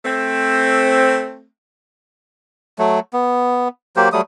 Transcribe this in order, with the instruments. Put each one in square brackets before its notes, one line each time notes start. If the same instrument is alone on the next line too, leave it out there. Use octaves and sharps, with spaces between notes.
[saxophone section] A3 C4
[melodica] F#3 A3
B3
F#3 A#3 G4 C5
F#3 G3 A3 D#6